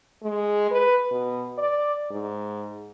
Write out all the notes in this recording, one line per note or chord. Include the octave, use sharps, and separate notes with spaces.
G#3
B4
B2
D5
G#2